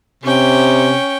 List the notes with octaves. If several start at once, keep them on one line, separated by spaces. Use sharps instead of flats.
C3 C#4 G5